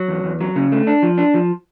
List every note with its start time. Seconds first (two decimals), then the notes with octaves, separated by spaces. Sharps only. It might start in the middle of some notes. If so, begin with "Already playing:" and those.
Already playing: F#3
0.08 E2
0.24 E2
0.41 F#3
0.56 C#3
0.72 A3
0.87 D4
1.03 F3
1.18 D4
1.34 F3